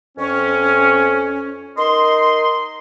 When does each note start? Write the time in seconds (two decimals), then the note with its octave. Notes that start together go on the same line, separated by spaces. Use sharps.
0.18 F2 C#4
1.78 D#4 A#4 D#5 C6